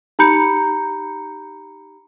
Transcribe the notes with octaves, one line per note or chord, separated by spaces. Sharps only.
D#4 G4 A#5 B5 G6 C#7